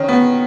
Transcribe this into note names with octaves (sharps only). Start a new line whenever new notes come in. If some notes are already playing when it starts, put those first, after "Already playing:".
Already playing: D#3 C#4
B3